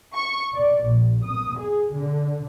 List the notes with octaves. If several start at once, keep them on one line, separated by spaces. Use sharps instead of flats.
C#6
D5
A#1
D#6
G#4
D3